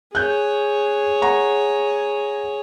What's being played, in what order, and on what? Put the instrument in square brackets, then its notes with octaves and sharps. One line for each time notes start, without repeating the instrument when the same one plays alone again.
[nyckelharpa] G#4 C#5 [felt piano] F#6 G6
[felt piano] F#5 A#5 C#6